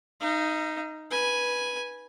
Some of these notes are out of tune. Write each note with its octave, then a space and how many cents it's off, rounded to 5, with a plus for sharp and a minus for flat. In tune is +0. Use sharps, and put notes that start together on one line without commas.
D#4 +0 F5 -45
B4 -10 G#5 +0